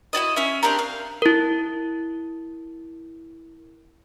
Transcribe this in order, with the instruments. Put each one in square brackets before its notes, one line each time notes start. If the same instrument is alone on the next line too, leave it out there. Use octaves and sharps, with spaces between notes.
[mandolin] E4 F#4 D5 D#5
C#4 E5
C4 D4 G4 A#4
F5
[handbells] E4 A#4